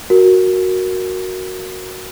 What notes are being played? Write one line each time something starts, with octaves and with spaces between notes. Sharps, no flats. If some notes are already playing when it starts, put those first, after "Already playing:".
F#4 A#4